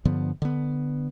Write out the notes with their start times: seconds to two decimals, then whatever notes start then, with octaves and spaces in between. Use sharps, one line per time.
0.05 G2 D3 F3 B3
0.42 D3 B3